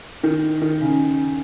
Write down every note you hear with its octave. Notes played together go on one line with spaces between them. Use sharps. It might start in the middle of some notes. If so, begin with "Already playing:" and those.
D#3
D#3
C#3